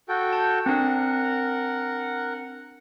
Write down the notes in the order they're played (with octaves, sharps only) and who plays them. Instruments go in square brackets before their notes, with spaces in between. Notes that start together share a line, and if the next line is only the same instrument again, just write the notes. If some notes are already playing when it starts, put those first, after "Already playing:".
[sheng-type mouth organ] F#4 A4 G5
[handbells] A5
[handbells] C4 D4 [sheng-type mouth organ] A#4 F#5